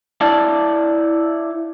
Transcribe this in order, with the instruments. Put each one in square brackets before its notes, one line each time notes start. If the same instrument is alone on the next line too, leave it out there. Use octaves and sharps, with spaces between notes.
[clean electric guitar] E4 C#5 D5 F5 A5